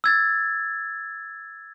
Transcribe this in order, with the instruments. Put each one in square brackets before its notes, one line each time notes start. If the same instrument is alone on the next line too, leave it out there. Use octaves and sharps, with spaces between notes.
[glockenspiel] E6 G#6 A6